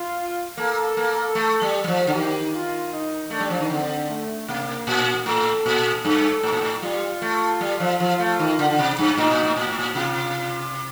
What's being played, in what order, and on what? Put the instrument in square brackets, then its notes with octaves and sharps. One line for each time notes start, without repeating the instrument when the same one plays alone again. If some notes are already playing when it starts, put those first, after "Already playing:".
Already playing: [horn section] F4
[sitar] A#3 [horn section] A4
[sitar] A#3
A3
G3
G3
F3
D3
[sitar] D#3 [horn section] G4
[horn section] F4
D#4
[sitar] A3 [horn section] D4
[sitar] G3
F3
D#3
[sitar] D3 [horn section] C4
[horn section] A3
[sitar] C3 [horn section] A#3
[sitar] A#2
[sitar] A2 [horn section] A4
[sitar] A#2
[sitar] G2 [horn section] A4
[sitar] A2
A#2
A2
[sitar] G3 [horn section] F4
[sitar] A3
G3
F3
F3
A3
D#3
D3
D3
C3
G2
[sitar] A2 [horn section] D#4
[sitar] A#2
A2
A#2
A2
A#2
[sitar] C3 [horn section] F4